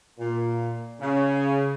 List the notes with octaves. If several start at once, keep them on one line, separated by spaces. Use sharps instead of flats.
A#2
C#3